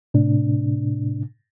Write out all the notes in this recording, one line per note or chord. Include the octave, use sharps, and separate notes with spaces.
A2 C3 D4